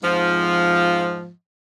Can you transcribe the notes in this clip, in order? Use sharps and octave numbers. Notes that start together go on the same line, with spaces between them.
F2 G#2 F3